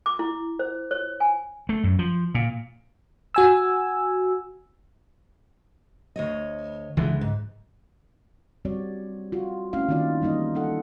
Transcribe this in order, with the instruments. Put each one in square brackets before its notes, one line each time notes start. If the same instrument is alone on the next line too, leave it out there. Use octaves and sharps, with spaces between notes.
[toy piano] D6
E4
C5
C#5
G#5
[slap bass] A3
F#2
F3
A#2
[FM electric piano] F#4 G#5 E6
[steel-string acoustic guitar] D2 C#5 D#5
[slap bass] C#2 D3 G#3 [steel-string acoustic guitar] E3
[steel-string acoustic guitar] G#2
[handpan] G3 C4 F#4 C#5 D5
F4 F#4
A3 C4 C#4 E4 F5
D#3 A#3 C4 D#4 F4 D5
E3 G3 A#3 D#4 D#5
G3 D#4 A4 F#5